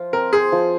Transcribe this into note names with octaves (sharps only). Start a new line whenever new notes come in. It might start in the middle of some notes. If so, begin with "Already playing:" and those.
Already playing: F3 F4
C4 A#4
G#4 C5
F3